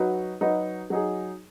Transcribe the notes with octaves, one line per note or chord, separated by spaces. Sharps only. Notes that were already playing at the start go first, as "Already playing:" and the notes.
Already playing: F#3 D#4 F#4 B4 D#5
F#3 D#4 F#4 B4 D#5
F#3 D#4 G#4